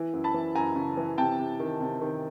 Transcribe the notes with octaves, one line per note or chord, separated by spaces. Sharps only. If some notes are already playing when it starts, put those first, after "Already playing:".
Already playing: E3
F#2
A5 B5
E3
F#2 G#5 A#5
C#3
E3
C3 G5 A5
C3
D#3
C3
D#3